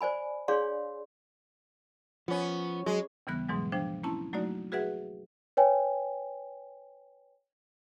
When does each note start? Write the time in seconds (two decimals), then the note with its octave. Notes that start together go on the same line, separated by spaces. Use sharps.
0.01 C5 D5 G#5 B5
0.48 D4 G#4 C#5 D5 F5 C6
2.28 F3 B3 C#4
2.86 F#3 G#3
3.27 D#2 C#3 E3 G3 B3 F#6
3.49 G#2 B2 E3 F#3 G#3
3.72 F3 D4 C5 G5
4.04 A#3 C4 C#4 E4 A5
4.33 F#3 A3 A#3 D#4 F#4 D5
4.72 F#4 G#4 B4 E5 F#5
5.57 B4 C#5 G5 G#5